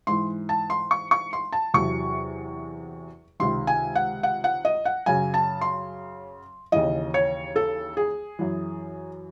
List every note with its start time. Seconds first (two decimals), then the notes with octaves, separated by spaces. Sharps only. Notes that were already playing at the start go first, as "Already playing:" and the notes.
0.07 G#2 E3 C6
0.49 A5
0.70 C6
0.91 C#6
1.11 C#6
1.33 C6
1.52 A5
1.74 E2 C3 F#3 C#6
3.40 C#2 C3 D#3 C6
3.67 G#5
3.95 F#5
4.23 F#5
4.44 F#5
4.65 D#5
4.85 F#5
5.06 F#2 C#3 F#3 G#5
5.34 A5
5.61 C6
6.72 D#2 C#3 E3 D#5
7.14 C#5
7.56 A4
7.97 G#4
8.39 F#2 E3